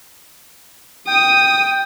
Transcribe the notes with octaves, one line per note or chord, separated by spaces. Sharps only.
G5 D#6